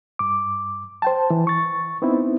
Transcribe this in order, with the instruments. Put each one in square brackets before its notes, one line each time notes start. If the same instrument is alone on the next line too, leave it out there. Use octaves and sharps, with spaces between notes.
[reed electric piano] G2 D6
C5 G5 A5
E3
C#6 A6
B3 C4 D#4 E4